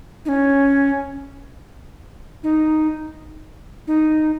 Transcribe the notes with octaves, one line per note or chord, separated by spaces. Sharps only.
D#4
C#4
D#4
D#4